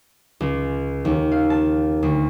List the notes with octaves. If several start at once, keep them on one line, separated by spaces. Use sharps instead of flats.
C#2
D#2
F5
A5
D2